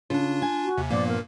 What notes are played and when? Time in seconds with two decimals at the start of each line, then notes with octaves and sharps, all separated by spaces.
0.10 C#3 D4 F4
0.42 G#5
0.64 F#4
0.78 D#2 C3
0.91 G2 A#2 F3 A#3 B3 D5
1.08 A#4